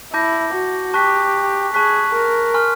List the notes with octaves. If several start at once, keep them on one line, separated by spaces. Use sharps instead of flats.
E4 A5 D6 G6 A#6
F#4
G4 A5 C#6 F#6 B6
G#4 A5 C#6 F#6 B6
A#4
G#5 C6 F6